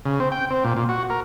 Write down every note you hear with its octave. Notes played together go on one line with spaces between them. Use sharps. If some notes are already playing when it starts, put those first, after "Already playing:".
C#3
C4
G5
C4
A#2
A#2
F#4
A#4